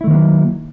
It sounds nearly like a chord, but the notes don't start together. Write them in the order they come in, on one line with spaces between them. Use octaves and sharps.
E4 A3 D#3 A#3 F#3